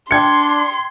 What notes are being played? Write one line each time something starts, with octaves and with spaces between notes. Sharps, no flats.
D4 G5 C6 G#6 C#7